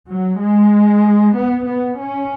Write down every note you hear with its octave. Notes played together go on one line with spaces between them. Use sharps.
F#3
G#3
B3
B3
C#4